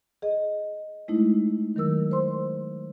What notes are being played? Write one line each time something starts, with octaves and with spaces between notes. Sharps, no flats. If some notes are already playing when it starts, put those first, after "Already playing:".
G#4 D#5
G#3 A3 D#4 E4
D#3 F#3 A#4 E6
C5 C6